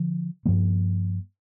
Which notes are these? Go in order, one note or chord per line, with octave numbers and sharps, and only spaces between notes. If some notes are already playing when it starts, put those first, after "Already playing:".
Already playing: D3 F3
G2 F3 A#3